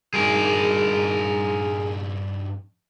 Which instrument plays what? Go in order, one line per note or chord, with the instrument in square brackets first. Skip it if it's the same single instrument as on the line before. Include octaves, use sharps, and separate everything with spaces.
[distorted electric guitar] G2 D#4 [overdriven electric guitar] G#4 A#4